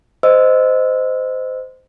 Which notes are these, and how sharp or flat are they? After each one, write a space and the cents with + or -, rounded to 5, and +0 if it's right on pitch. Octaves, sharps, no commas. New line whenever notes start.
C5 -20 D#5 -5 E6 +0